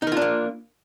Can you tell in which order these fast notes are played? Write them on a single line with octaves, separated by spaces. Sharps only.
D#4 A#4 F4 D4 A#3